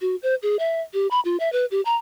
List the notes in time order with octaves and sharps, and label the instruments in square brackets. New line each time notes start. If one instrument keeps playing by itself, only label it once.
[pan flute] F#4
C5
G#4
E5
G4
B5
F4
E5
B4
G4
A#5